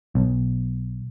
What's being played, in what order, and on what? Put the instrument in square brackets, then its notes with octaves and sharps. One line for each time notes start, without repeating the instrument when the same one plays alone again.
[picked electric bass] B1